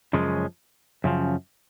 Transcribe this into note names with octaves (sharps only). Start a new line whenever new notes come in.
F#2 C#3 F3 G#3 C#4
F#2 C#3 F3